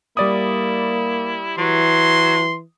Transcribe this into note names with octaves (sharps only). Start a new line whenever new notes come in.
G3 A#3 E4 D5 D#6
E3 F#3 C6